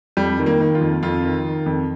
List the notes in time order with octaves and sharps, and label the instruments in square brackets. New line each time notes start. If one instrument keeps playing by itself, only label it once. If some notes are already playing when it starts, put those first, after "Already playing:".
[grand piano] F2 G3
D#3
A#3
D#3
F4
F2
F2 F4
D#3
D#3
F2